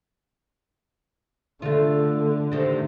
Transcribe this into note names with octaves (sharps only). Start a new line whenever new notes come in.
D3 A3 F4
C3 D#3 A3